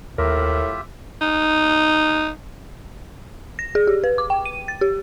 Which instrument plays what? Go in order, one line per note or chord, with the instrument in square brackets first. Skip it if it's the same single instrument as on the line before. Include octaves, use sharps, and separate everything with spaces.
[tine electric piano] D#2 [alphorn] A2 [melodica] F4 G4 E5 [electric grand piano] A#4
[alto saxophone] D#4
[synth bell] A#6
G#4
G4
B4
D6
G5
D#7
A6
G4